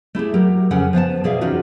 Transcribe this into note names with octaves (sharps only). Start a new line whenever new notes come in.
A3 E4 G4 G#4
F#3 G4 A#4
F2 C#3 C#4 F#5 G#5
F3 B3 F5 A5
B2 G#4 D5 E5 F5
E2 C3 C#4 D#4 F4 F#4